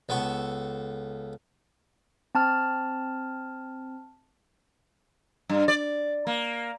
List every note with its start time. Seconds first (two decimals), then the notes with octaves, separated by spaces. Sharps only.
0.09 C#2 B3 A4 C#6
2.35 C4 A5 F6
5.49 G2
5.68 D5
6.27 A#3